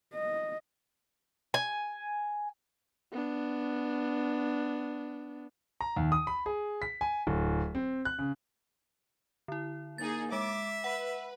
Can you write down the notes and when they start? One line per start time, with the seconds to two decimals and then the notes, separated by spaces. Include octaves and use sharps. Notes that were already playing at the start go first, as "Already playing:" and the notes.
0.14 D#5
1.54 G#5
3.12 B3 D4
5.81 A#5
5.96 D#2
6.12 D#6
6.27 B5
6.46 G#4
6.82 B6
7.01 G#5
7.27 D1
7.75 C4
8.05 F#6
8.19 C#3
9.48 D3 E4
9.98 A#3 D#4 G#4 A6
10.32 G#3 E5 D6
10.84 B4 F#5